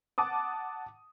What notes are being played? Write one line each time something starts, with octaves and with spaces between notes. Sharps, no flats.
F#5 A5 D6 D#6